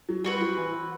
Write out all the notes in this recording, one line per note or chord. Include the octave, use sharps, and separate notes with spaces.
F#3
G3 C4 F#4 B4
F#3
E3